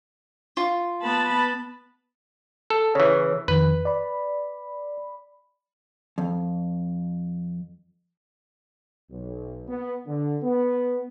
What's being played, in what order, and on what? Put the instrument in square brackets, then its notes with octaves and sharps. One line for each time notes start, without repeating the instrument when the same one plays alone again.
[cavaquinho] F4
[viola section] B3 A5 B5
[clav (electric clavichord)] A4
[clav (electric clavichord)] C#3 E3 [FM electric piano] C#5
[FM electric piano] F2 D#3 [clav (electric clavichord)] B4
[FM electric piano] D5 B5
[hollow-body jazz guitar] F2
[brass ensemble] B1
B3
D3
B3